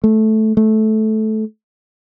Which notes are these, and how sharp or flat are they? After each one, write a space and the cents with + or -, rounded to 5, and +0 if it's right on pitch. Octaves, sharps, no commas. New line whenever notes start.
A3 -10
A3 -15